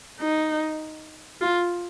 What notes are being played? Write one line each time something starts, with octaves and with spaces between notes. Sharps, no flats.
D#4
F4